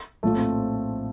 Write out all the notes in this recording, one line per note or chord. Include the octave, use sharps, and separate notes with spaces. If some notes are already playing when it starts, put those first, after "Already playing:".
A#1 A2 F3 A3
C4